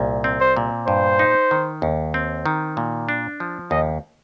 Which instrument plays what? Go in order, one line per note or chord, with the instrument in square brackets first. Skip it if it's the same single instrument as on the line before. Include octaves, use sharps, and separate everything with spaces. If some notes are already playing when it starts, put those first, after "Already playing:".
Already playing: [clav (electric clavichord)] C2 A#2
C4
[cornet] C5
[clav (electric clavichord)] A#2
[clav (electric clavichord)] G2 [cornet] C5
[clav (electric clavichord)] D#4
D#3
D#2
C4
D#3
A#2
D4
F3
[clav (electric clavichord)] D#2 [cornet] D#5